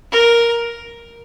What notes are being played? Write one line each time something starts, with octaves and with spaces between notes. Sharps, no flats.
A#4